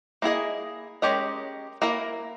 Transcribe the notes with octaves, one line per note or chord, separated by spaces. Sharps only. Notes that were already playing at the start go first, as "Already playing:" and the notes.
A#3 E4 G#4 D#5
G#3 C#4 G4 A#4 D#5
A#3 E4 A#4